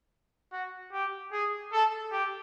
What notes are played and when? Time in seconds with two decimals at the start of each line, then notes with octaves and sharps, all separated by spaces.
0.52 F#4
0.93 G4
1.32 G#4
1.72 A4
2.12 G4